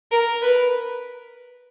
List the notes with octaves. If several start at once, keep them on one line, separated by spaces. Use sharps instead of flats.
A#4
B4